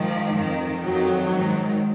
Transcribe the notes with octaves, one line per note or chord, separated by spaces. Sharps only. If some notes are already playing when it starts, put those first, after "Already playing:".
Already playing: G#2 D#3 F3
F2 D#3
F2 D#3 F#3
G#2 D#3